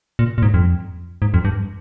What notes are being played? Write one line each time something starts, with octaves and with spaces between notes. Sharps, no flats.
A#2
A#2
G#2
F2
G#2
F2
G2